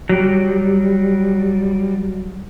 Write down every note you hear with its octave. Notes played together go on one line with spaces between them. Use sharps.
F#3 G3